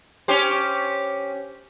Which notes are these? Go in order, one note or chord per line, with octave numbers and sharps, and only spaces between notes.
C#4 G4 C5